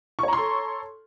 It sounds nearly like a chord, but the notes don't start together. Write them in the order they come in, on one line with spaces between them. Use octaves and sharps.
C#6 C#5 A#5 C6 A4